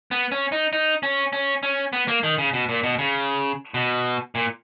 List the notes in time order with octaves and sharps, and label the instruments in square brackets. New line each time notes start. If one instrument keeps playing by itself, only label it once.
[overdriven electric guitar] B3
C#4
D#4
D#4
C#4
C#4
C#4
B3
A#3
D#3
C#3
B2
A#2
B2
C#3
B2
A#2